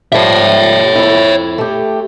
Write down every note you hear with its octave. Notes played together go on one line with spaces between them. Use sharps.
F3 G3 C#5 E5
F2 E4
A3 G4